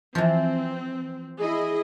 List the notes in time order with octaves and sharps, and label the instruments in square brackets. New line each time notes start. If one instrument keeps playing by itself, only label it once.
[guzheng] E3 F3 [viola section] C4
[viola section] E4 G#4 D#5